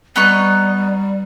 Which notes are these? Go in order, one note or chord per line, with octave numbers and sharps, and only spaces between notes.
G3 B3 D#4 C#6